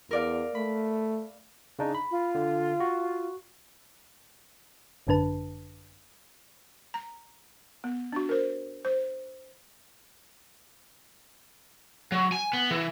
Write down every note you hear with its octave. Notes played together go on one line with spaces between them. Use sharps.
E2 A#4 D5 F5
A3 B5
C#3 D4 D#4
B5
F4
D3
F#4
G#1 F#2 D3 D4 B4 A5
A#5
B3
D4 F#4
A#4 C5
C5
F#3
G#5
B3
E3